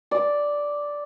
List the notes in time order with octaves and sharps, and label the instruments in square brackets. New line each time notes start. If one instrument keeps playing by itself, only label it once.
[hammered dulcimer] D5